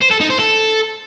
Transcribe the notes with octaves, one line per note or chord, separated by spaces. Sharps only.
C5
A4
D#4
C5
A4